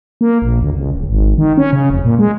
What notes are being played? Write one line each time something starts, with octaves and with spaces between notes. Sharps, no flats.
A#3
A#1
D2
C#2
D1
G#1
D#3
C#4
C#3
F1
A#2
G#3